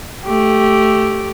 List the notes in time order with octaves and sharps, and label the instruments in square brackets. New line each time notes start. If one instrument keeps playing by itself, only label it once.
[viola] A3 G4